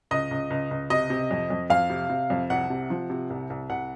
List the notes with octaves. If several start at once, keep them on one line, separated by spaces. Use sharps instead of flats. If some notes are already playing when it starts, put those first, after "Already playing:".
C#2 D#5
C#2
C#2
C#2
C3 D#5
C3
F2
F2
F2 F5
C3
C3
F2
C2 F#5
C3
F3
C3
C2
C2
C2 F#5